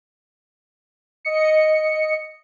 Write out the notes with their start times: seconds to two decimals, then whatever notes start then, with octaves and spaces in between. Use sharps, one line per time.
1.25 D#5 C#7